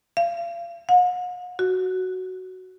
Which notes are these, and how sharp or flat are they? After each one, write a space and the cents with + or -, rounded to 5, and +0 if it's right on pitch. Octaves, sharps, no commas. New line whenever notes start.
F5 -35
F#5 -45
F#4 +5